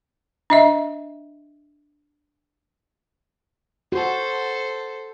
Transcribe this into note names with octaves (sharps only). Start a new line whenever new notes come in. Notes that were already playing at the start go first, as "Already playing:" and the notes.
D4 D#5 E5
F#4 A4 C5